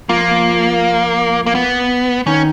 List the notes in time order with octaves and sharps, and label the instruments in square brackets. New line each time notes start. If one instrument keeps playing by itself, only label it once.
[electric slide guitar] F3 F4 [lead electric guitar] A#3
[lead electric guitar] A#3
B3
[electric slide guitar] D#3 D#4 [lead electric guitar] C#4